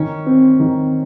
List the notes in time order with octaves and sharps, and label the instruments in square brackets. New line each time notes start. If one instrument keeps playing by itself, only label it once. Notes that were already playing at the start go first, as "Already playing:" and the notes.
Already playing: [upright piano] D#3 [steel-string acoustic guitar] C#4
[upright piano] C4
D#3